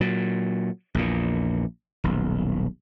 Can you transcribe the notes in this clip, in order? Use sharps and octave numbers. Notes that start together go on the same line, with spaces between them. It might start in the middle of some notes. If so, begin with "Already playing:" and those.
A#2 F#3
A#1 E2 A#2
D#1 B1